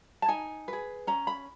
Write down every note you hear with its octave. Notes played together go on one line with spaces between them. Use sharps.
A5
D#4 G#5
G#4 B4
C#4 A#5
B5